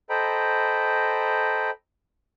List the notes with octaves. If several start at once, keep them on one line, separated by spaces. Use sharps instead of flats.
A4 C5 D#5 G5 A#5 B5